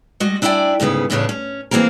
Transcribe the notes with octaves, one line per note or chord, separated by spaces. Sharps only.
G3 G#3 F#4 D#5
D4 E4 D5 E5 G5 G#5
D2 G#2 C#3 B3 B4
E2 A2 C#3 D4 B4 C#5
C#4
E3 A#3 C4 G#4 A#4